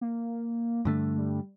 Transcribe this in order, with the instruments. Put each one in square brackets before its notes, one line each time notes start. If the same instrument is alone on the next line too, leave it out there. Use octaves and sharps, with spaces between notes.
[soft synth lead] A#3
[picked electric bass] G2 D3 A3
[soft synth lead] G3